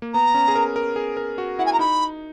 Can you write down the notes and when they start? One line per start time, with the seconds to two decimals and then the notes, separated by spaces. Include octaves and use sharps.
0.02 A#3
0.13 B3 A#5
0.34 C#4
0.48 G#4
0.55 A#4
0.76 A#4
0.96 G#4
1.17 A#4
1.38 F#4
1.58 E4 F#5
1.65 G#5
1.73 A#5
1.79 D#4 B5